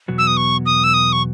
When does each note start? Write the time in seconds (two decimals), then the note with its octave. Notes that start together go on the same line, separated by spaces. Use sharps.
0.08 E2 B2 F#3 B3 F#4
0.18 E6
0.27 D#6
0.37 C#6
0.66 D#6
0.84 E6
0.94 D#6
1.13 C#6